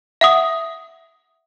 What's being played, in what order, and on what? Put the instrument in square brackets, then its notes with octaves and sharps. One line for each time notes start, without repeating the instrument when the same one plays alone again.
[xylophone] E5 F#5 D#6